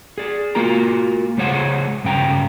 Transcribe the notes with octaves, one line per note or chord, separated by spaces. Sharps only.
G#4 D5
A#3 F4 F#4 A#4 A#5
C#3 G#3 G#4 C5 C#5 F#5
G2 C#3 G5 A#5